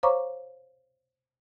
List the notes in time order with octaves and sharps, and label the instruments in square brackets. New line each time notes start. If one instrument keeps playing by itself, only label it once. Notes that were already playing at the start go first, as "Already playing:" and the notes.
[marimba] C5 C#5 F5 A#5 C#6 D6